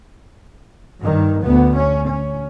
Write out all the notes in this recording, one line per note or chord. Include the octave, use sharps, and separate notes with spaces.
G2 D#3
D2 B3
C#4
C#4